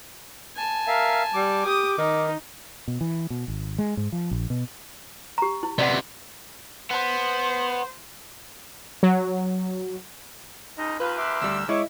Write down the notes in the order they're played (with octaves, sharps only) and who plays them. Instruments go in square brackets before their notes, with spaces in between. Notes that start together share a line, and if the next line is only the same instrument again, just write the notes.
[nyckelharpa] G#5 A5
[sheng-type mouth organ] A#4 E5 F5
[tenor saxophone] G3 [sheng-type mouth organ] D6
[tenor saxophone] G4 [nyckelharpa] D#6
[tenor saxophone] D#3 [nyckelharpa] D#4
[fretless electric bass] B2
E3
B2
G#1
G#3
G#2
F3
A#1
B2
[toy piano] G4 A#5
E4
[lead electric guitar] C3 B3 [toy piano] D5 F5 F#5
[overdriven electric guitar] B3 [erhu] C5
[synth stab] F#3
[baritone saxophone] C#2 [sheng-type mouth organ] D#4 D#5
[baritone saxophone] D#2 [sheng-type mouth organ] F4 [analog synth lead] B4
[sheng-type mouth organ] E5 C6 D6
[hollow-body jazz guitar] D2 G3 [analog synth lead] E6
[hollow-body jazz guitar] G#3 [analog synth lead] E4 [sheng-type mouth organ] C#5 C#6 D6